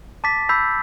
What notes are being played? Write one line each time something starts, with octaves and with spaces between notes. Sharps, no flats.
A5 D6 A6 B6
B5 E6 G6 B6 C7